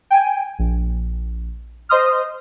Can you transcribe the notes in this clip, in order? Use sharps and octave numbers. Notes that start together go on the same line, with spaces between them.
G5 G#5
A#1
C5 D#5 C6 D#6 F6